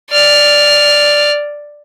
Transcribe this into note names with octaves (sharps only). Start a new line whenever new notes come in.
D5 F6